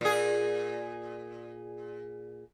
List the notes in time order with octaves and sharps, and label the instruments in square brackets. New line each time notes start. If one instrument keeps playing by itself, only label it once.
[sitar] A#2 G#4